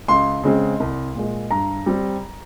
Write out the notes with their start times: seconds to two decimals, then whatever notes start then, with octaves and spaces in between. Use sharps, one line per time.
0.08 C#2 C6
0.43 C#3 G#3 C4
0.80 C2
1.15 A#2 G#3
1.51 G2 A#5
1.86 G3 C4